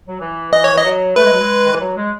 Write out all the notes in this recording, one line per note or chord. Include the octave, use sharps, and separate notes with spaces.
F#3
E3
E3 D#5
C#5
E3 D#5
F#3
A3 B4
G#3
F#3
G#3
D#3
E3
F#3
G#3